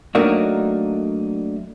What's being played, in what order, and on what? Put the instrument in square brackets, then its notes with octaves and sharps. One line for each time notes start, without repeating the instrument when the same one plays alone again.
[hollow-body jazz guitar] F#3 A3 A#3 D4 D#4 F#4